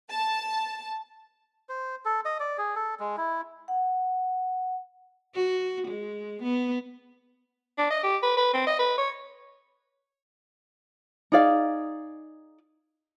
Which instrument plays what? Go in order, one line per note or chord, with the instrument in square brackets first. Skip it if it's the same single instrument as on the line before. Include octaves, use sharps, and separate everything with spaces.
[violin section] A5
[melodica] C5
A4
D#5
D5
G#4
A4
G#3
E4
[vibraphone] F#5
[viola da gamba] F#4
G#3
B3
[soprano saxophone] D4
D#5
G4
B4
B4
C4
D#5
B4
C#5
[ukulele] D#4 G#4 D5 F5